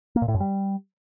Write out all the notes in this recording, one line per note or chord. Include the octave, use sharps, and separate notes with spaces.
A#3
A#2
A2
F#2
G3